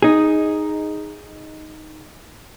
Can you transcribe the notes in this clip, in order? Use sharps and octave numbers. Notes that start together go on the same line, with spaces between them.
D#4 G#4